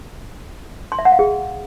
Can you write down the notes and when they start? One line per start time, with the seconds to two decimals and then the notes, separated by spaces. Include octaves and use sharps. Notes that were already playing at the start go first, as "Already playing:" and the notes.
0.92 C6
0.99 E5
1.05 F#5
1.12 F5
1.19 G#4